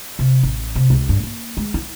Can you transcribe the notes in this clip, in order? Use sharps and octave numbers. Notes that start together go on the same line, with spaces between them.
C3
A1
C3
C#2
G2
A#3
G#3
E4